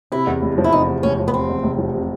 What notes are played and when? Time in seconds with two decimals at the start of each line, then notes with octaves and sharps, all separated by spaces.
0.12 C3 E4
0.27 E2
0.42 F1
0.58 F3
0.64 E4
0.72 C3 D#4
0.88 E2
1.03 F1 C#4
1.19 F3
1.28 B3
1.34 C3 C4
1.49 E2
1.63 F1
1.78 F3
1.94 C3